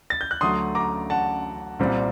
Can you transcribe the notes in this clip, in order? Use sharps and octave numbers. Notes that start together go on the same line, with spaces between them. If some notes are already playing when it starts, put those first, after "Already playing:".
A6
G6
F#6
D2 D3 F#3 A3 C6 D#6
A#5 D6
F#5 A5
C2 A#2 G3 C4